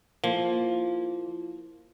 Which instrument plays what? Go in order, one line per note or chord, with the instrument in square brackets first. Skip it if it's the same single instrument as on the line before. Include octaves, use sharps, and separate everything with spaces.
[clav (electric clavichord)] F3 [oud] A#3 [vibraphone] E4 F4